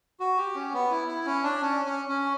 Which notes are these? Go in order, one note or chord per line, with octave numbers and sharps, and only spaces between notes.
F#4
G4
C#4
B3
E4
E4
C#4
D4
C#4
C#4
C#4